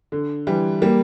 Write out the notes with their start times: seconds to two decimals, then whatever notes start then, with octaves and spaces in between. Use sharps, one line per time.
0.12 D3
0.47 E3 G3
0.82 G3 A#3